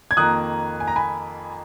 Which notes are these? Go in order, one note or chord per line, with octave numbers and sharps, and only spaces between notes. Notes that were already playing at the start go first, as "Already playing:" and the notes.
G#6
F2 D#3 A#3 D#6 F#6
G#5
A#5
G#5 B5